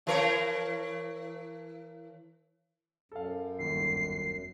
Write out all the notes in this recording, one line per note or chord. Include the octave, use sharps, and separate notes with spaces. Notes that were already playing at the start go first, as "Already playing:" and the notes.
E3 A#4 C#5
F#2 A4 F5
G1 D#2 C7